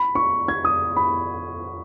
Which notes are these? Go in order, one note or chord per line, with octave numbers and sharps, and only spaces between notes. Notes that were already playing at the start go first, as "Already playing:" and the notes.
Already playing: B5
C#6
G#6
D#6
B5